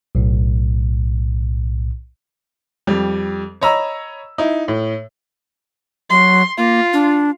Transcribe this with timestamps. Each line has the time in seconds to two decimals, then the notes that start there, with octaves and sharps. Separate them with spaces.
0.15 B1 A2
2.87 F2 G3
3.61 C#5 D#5 A#5 B5 E6
4.38 D#4 E4
4.68 A2
6.10 F#3 C6
6.58 A#3 F4
6.93 D4